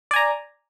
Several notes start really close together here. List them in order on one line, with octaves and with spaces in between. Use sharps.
D5 G#5 A#5